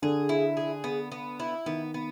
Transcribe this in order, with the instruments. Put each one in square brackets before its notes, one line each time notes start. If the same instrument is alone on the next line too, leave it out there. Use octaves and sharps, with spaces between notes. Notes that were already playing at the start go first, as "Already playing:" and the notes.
[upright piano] D3 [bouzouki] G#4
[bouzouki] E4
G#4
B3
B3
E4
[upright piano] D#3 [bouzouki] B3
[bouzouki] B3